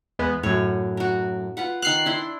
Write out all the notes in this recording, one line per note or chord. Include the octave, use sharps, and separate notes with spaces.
E2 G#3 B3
F#2 A2 C#5
F#4 A#4
F4 B4 F#5
D#3 F5 F#6 C7
D4 E4 C6